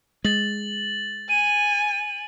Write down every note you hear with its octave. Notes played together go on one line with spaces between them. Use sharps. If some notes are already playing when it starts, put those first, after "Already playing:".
G#3 A6 F#7
G#5 D#7